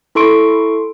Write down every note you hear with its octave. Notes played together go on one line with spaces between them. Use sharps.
E4 A4 C6 C#6 D7